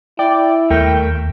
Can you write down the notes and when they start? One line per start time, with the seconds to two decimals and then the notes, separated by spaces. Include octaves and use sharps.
0.19 E4 D5 G5
0.71 D#2 A3 A#4 G5